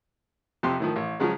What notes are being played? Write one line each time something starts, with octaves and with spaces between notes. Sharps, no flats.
F2 C3 G4 C6
A2 D#3 F3
A1
C#3 F3 F#3 G#3